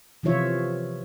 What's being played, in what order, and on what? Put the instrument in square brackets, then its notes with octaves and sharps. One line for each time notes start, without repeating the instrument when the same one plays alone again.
[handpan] C3 E3 F3 F4 C#5 E5